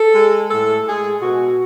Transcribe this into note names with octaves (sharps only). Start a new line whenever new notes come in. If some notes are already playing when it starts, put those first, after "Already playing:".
Already playing: A4
G#3
A2 A4
G#3 G#4
B2 F#4